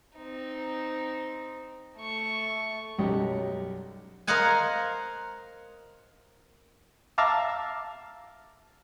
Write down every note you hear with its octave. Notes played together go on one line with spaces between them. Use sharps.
C4 D#4
A3 C#6
B1 F#2 F#3 G3 G4 D#5
A#4 C5 D#5 F5 F#5 G#5
E5 F5 A5 A#5 D6